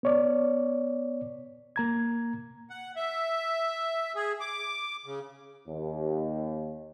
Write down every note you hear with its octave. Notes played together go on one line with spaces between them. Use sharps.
B3 C#5 D5
A#3 A#5 G#6
F#5
E5
G#4
D6
C#3
D#2